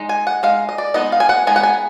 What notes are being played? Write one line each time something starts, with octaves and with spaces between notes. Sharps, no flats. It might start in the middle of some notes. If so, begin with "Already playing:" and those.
Already playing: G#3 D#4
G#5
F#5
G#3 D#4 F5
D#5
D5
G#3 B3 D#4 D#5
F5
G#5
F#5
G#3 B3 D#4 G#5
F#5
G#5